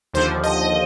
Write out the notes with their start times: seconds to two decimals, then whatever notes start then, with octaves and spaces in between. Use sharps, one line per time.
0.13 D#2 D3 F3 C5
0.44 D#5